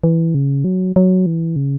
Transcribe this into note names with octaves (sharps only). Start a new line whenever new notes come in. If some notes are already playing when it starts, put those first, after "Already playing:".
E3
C#3
F#3
F#3
E3
C#3